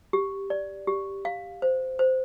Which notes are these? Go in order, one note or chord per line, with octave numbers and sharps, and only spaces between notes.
G4
D5
G4
F5
C5
C5